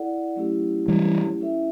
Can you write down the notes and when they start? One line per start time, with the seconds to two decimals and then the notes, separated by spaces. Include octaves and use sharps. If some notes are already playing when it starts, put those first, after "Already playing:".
Already playing: E4 A4 D5 F#5
0.36 F#3 A3 C#4 E4 G4
0.88 E3 G3
1.41 C#4 E4 A4 C#5 E5